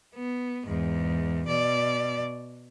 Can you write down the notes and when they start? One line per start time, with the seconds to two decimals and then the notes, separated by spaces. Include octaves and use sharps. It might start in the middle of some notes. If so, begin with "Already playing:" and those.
0.14 B3
0.67 E2 G#2
1.47 B2 D5